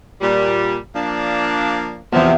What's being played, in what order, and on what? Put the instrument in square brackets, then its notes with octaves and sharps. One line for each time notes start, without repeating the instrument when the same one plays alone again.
[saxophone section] A#2 G3
F3 A#3 D4
[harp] E2 E3 [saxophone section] C3 F3